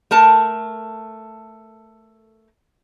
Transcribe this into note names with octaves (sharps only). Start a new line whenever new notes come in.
A3 A#4 A5